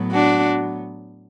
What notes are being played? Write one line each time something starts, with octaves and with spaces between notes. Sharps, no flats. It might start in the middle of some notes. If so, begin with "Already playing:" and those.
Already playing: A2 F#3 B3
D4 F#4